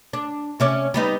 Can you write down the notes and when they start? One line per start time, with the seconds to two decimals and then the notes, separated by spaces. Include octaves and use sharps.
0.13 D4
0.60 C3 C#4 D5
0.94 G3 B3 D#4